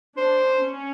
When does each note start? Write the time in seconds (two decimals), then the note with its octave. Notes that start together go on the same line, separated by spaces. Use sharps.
0.17 D4 C5
0.60 C#4